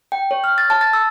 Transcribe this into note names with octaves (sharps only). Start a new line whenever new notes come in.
G5
C#5
F6
A6
A5
A6
E6